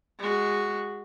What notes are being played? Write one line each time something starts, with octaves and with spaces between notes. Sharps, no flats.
G#3 F#4